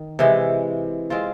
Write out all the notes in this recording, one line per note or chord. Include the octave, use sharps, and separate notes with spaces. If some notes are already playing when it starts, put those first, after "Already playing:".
Already playing: D#3
C3 E3 G#3
G#3 C4 F4